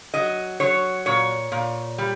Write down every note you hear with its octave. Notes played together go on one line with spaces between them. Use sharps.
F#3 D#5
F#3 C#5
A#2 C#5
A#2
G3